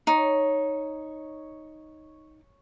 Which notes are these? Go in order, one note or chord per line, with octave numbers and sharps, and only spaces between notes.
D#4 C#5